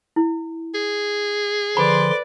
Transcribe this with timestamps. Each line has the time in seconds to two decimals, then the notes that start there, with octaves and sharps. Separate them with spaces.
0.16 E4
0.74 G#4
1.77 D3 F3 B4 D5 B5 C6